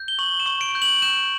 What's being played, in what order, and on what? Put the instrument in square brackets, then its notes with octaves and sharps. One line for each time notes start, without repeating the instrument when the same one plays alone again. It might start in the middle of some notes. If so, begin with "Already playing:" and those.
Already playing: [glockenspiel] G6
G7
C#6 F#7
E7
C#6
D7
G6
F#7
G6 E7